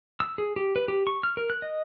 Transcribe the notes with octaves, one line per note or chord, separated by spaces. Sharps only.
E6
G#4
G4
B4
G4
C#6
F6
A#4
F#6
D#5